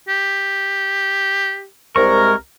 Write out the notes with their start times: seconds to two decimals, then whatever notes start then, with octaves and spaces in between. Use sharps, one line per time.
0.08 G4
1.96 C2 G#3 A#4 C#6